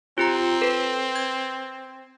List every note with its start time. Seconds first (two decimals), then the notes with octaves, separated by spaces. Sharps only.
0.18 C4 F4 G4 A#5
0.62 A4 B4
1.16 G#6